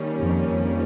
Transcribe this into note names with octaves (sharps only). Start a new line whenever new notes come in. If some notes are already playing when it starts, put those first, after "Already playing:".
Already playing: D#3 G3 A#3 C#4
F2 F3
F2 F3